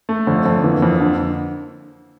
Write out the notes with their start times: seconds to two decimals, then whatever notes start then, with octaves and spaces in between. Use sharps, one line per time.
0.09 A3
0.27 F2 D3
0.46 F2
0.64 E3 A#3
0.82 F2
1.00 D3